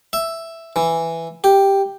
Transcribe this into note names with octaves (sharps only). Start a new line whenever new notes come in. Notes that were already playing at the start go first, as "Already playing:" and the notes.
E5
E3
G4